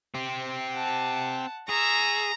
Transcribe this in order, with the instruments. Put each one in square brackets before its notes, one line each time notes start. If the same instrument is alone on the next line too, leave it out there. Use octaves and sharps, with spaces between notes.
[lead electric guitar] C4 G4
[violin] F#5 A5
[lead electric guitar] G#4 [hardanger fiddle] A#5 [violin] C#6 E6